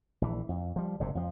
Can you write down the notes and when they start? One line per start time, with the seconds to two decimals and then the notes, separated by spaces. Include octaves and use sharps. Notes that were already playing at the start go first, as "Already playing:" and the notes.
0.22 A#1 E3
0.49 F2
0.76 F3 G3
1.00 F#1 G#2 C3
1.15 F2 F3